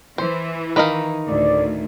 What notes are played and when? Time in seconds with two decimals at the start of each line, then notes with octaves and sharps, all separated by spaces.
0.18 E3 C5
0.76 D#3 D#4 B4 D#5 F5
1.27 D2 A2 D5